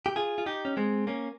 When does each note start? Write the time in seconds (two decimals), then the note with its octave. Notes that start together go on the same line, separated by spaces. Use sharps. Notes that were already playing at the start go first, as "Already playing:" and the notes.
0.06 G4
0.16 F4 G#4
0.38 F4
0.46 D#4 G4
0.65 C#4
0.77 G#3 C4
1.07 A#3 C#4